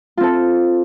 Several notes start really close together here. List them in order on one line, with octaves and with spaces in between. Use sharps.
F4 C4 A4